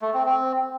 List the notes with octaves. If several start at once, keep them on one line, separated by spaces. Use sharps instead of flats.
A3
C4
C4